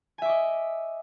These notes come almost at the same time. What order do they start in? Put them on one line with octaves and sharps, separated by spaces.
G#5 E5 D6 D#5